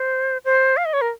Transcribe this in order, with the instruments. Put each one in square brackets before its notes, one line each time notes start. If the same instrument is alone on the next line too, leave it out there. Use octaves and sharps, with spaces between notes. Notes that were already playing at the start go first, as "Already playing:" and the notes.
Already playing: [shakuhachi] C5
C5
F5
D#5
C#5
A#4